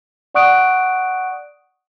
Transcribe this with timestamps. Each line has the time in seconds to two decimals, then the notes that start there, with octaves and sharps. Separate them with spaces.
0.35 D5 F#5 C#6 D#6 F#6 D7